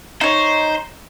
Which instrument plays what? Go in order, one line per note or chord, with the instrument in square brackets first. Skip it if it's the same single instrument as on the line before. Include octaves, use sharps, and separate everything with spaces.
[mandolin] D#4 C#5 [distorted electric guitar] C5